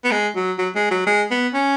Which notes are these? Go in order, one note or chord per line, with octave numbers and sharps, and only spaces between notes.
B3
G#3
F#3
F#3
G#3
F#3
G#3
B3
C#4